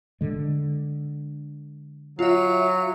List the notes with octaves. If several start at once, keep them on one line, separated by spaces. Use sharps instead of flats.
D3 G#3
F#3 F4 E5